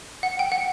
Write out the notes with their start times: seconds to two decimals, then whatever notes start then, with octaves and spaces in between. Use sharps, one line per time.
0.23 F#5
0.39 G5
0.52 F#5